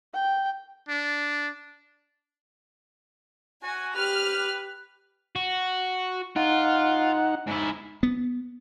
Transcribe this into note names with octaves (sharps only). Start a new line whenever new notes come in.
G5
D4
F#4 G#5
G4 B4 F6
F#4
D#4 F4 F#5
G#2 E4
B3